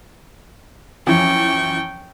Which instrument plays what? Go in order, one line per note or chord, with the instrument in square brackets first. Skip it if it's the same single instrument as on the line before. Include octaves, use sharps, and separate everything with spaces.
[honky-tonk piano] F#2 E3 F3 [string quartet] G5 C#6